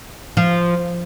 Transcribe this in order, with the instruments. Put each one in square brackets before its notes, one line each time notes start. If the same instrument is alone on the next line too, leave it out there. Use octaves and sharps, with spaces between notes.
[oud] F3